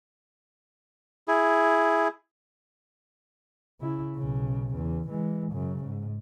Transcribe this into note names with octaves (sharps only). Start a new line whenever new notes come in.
E4 G#4
C#3 E4
B1 C#3
E2
E3 G#3
F#2 C#3
G#2